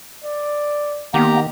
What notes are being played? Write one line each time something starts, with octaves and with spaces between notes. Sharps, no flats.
D5
D#3 A#3 B3 G4 A#5